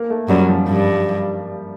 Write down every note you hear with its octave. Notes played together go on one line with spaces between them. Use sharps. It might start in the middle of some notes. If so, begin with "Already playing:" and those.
Already playing: A#3
A3
F#2 G3
F3
G2 F3